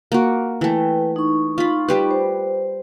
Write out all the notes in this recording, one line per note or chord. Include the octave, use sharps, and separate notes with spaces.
A#3 F#4
E3 A3 B4 G5
D#4 C#6
F4 B5
G3 G4 B4
C5